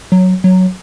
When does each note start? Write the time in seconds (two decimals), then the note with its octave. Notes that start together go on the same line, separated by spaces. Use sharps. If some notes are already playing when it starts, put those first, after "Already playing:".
0.12 F#3
0.44 F#3